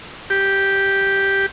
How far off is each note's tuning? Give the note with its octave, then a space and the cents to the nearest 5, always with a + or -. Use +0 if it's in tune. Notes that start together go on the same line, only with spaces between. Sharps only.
G4 +0